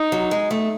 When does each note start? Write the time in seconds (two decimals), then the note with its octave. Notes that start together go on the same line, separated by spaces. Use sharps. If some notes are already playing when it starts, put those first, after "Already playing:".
Already playing: D#4
0.12 F#3
0.31 G#3
0.51 A3